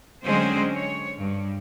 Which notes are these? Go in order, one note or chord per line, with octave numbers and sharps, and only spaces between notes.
D3 F#3 G#3 C4 C#4 C5
C#5
G2